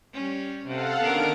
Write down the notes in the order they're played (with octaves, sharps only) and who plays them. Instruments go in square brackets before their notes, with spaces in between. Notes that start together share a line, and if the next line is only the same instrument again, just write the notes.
[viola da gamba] G3 C#4
[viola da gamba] C3 [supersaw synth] A4 F5 F#5
[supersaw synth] D3 D#3 D7 [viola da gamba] B3 C#4 A#4